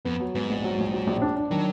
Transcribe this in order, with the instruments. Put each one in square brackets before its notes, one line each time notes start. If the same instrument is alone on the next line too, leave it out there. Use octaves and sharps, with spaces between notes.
[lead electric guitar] F2 [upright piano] B3
[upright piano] F#3
[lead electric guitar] G#2 [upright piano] B3
[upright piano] A#1
F#3
A#1
F#3
A#1
D4
D4
[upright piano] D#3 [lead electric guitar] F#3